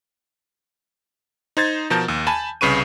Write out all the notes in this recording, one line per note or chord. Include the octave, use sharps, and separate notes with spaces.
D#4 C5 G#6 A6
B2 F3 A#4 A5 G6
D#2
G#5 A5 B5
C2 C#3 B4 C#6 D#7